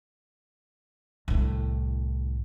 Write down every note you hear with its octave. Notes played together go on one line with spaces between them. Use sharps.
C2 A2